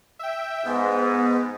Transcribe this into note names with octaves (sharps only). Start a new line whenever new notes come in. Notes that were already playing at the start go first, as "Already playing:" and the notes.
E5 G5
G#2 B3